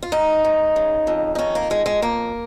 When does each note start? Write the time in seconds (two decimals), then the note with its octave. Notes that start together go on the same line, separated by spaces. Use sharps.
0.03 F4
0.12 G#2 D#4
0.45 G#2
0.76 C#3
1.07 F2
1.35 D#4
1.39 D#3 C#4
1.55 A#3
1.70 F2 G#3
1.86 G#3
2.02 F2 A#3